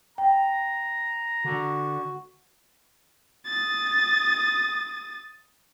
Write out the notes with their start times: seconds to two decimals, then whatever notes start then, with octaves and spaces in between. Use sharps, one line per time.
0.18 G5 A#5
1.45 D3 F#4
3.46 D#6 A6